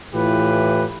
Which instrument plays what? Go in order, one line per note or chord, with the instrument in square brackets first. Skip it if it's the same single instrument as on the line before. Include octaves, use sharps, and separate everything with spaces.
[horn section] A2 E3 F4 G4 B4